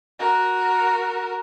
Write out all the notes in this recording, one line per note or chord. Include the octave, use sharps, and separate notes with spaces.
F#4 A#4